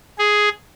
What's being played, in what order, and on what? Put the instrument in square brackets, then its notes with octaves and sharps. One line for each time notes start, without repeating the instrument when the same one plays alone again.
[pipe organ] G#4